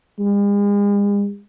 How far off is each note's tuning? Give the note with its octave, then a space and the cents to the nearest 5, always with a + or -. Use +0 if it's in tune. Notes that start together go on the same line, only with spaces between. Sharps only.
G#3 -45